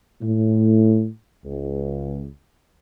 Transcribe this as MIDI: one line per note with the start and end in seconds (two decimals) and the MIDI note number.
0.21 1.08 45
1.45 2.26 37